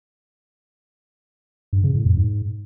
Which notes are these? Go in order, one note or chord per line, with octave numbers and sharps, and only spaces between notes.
G2
C#3
A2
F2
G#2